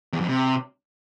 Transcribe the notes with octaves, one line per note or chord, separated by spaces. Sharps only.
E2
F2
C3